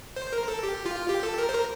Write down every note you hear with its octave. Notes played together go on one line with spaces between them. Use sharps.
C5
A#4
A4
G4
F4
G4
A4
A#4
C5
A#4